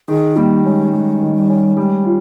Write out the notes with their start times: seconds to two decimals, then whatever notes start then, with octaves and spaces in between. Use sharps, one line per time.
0.08 D#3 G#4
0.36 G3 A#3
0.65 G#3 C#4
0.92 G3 G#3
1.21 D#3
1.35 G3
1.49 C#4
1.77 G3 G#3
2.05 F4